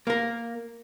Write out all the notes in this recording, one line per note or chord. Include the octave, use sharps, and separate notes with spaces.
A#3 A#4